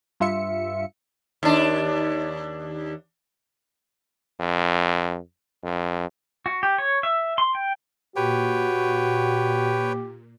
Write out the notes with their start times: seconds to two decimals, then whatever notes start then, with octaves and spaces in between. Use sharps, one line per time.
0.20 G2 F4 E5 C#7
1.43 D#2 D4
4.40 F2
5.64 F2
6.46 F#4
6.63 G4
6.78 C#5
7.03 E5
7.38 C6
7.55 G5
8.16 A#2 F#4 G4 B4 C#5 G5